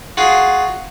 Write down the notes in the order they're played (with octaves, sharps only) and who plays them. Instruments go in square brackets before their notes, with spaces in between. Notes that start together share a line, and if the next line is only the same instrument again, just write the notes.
[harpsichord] F4 F#4 G#4